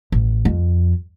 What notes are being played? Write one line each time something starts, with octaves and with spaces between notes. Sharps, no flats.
A1
F2